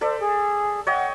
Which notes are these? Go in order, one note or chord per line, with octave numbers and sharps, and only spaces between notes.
A4 C5 D5 E5
G#4
C#5 D#5 F#5 G5